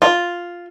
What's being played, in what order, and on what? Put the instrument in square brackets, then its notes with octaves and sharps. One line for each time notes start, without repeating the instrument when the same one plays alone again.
[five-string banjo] F4